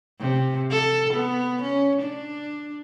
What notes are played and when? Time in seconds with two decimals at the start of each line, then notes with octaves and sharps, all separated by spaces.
0.20 C3
0.71 A4
1.14 B3
1.62 C#4
2.02 D4